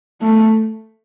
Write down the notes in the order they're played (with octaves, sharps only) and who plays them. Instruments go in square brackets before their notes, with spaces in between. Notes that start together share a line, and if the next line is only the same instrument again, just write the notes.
[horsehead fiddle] A3